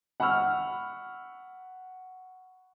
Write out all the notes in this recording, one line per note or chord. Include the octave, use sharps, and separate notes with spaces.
F#5 B5 C#6 E6 F6